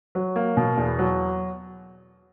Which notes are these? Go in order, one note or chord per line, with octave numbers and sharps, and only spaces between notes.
F#3
A#3
B2
E2
F#3